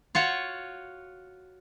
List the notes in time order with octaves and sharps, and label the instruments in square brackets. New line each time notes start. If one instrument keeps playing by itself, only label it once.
[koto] F4 F#4 C#5